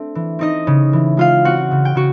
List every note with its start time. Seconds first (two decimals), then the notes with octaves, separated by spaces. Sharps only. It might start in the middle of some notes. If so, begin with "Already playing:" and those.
Already playing: A3 C4 D4
0.15 E3
0.39 C4 D#4 D#5
0.67 C#3
0.93 E3
1.17 G#3 F4 F5
1.45 C4 F#4 F#5
1.71 C#3
1.85 G5
1.95 C#3 F#4